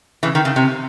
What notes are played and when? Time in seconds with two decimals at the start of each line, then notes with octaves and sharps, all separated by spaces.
0.23 C#3 E3
0.35 D#3
0.45 C#3
0.56 C3